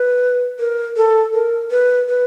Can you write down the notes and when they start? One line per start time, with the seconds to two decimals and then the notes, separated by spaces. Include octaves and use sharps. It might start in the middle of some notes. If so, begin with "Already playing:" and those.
Already playing: B4
0.59 A#4
0.96 A4
1.34 A#4
1.71 B4
2.09 B4